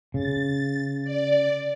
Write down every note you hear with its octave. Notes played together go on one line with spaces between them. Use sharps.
C#3 A6
D5